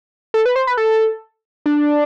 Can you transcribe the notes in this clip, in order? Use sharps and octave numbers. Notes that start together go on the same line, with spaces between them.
A4
B4
C5
B4
A4
D4